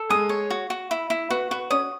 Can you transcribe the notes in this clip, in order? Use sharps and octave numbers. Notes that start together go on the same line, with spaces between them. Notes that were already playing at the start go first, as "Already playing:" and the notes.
Already playing: A4
G#3 G#4 D#6
C#5
F#4
F#4
E4
E4
B3 F#4 B4
B3 F#4 B4
C#4 C#5 D#6